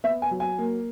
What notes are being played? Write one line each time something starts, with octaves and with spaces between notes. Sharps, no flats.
B3 E5
G#5
F#3
G#5
A#3